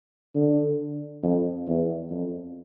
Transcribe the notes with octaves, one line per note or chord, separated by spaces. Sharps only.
D3
F2
E2
F2